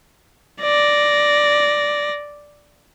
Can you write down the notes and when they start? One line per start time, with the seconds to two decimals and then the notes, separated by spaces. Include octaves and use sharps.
0.62 D5 A#6